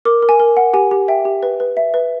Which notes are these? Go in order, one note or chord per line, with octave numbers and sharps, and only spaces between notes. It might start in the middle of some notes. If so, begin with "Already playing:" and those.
A#4 D6
A#4
G#5
A#4
F#5
G4 G#5
G4
E5 G5
G4
B4
B4
E5
B4